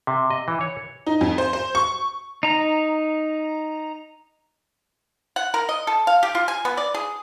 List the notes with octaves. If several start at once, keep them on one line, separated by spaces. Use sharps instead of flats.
C3
D#5
E3
C#5
D#4
F2
C5
C5
C#6
D#4 A#5
F#5
A#4
D#5
A4
F5
G4
F4
G#5
B3
D5
G#4